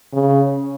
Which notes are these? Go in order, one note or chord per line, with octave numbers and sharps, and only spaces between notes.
C#3